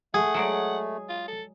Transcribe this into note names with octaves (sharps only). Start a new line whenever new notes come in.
A3 G#4 F#5
F#3 G#3 D5
F4
A4